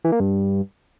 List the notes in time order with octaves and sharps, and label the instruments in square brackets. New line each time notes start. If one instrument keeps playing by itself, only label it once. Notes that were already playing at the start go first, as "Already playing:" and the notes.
[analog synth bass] E3
A#3
G2